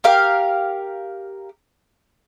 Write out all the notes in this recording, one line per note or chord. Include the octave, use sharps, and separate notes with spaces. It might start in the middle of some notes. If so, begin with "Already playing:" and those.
G4 A#4 F5